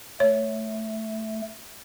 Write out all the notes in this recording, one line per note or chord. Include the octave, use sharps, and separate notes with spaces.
A3 C#5